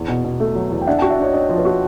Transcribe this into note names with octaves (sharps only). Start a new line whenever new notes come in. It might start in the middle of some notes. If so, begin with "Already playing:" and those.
Already playing: E2
B2
B2
A3
F#3
E2
G5
D4 E5 F#5
F#4 G5 A5
D5 E5
D4 C#5 D#5
D4 C#5 D#5
F3
B4 C#5
F#4